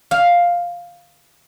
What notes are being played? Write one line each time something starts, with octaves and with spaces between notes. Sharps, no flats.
F5